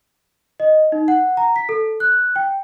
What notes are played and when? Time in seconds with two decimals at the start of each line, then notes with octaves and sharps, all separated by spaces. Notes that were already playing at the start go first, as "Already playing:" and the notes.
0.60 D#5
0.92 D#4
1.08 F#5
1.37 A#5
1.56 B6
1.69 A4
2.00 F#6
2.36 G5